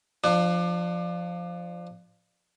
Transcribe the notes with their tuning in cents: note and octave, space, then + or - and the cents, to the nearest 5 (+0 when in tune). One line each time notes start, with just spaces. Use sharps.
F3 +0 D4 +25